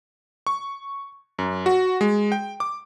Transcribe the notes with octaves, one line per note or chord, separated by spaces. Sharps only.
C#6
F#2
F#4
G#3
G5
D6